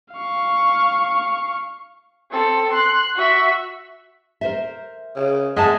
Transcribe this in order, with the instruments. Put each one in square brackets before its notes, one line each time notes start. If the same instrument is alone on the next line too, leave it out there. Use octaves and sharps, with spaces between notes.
[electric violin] F5 C#6
[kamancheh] C4 A4
C6 F#6
F#4 E5
[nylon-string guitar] A#4 C5 E5
[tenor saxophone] C#3
[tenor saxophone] G#3 [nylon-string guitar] E5 F#5 A5